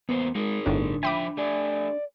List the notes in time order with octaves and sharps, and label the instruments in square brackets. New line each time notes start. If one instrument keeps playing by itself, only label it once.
[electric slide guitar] E2 A#3 C5 [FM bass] B3
[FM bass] G#3 [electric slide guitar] D#4 G#4 A#4
[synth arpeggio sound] G1 A2 [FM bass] D4
[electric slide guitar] F3 E5 [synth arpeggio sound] G5 B5 D6
[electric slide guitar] A3 G4 G#5 [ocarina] D5